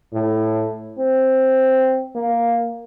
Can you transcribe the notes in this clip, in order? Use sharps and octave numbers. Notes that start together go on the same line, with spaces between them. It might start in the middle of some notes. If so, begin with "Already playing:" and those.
A2
C4
A#3